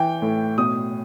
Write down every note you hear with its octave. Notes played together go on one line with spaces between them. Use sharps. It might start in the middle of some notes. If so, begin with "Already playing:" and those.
Already playing: E3 G5
A2
B2 D#6